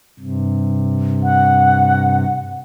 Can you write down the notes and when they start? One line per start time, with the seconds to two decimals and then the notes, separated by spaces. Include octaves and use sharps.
0.19 G2 C3
1.23 F#5